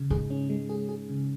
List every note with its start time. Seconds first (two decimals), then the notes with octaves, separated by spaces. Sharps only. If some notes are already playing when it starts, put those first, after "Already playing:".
Already playing: C#3
0.10 G#2 G#4
0.30 C#4
0.50 G#3
0.69 G#4
0.89 G#4
1.09 C#3